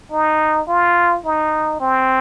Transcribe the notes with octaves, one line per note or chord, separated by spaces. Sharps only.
D#4
F4
D#4
C4